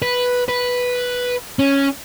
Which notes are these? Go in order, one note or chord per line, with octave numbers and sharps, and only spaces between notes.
B4
B4
C#4